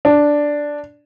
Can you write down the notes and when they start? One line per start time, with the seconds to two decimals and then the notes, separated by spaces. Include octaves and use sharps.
0.05 D4